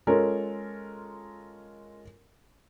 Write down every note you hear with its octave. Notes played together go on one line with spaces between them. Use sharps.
G#3 C#4 F4 A4 A#4